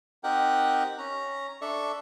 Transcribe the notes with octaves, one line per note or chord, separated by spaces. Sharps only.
C4 D#4 G4 A#4 F#5 G5
C#4 A#5
D4 A4 D5 E5 C#6